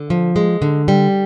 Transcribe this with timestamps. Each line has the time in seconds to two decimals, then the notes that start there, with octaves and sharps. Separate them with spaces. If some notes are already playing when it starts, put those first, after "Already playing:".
Already playing: D3
0.10 F3
0.36 G#3
0.62 D3
0.88 G3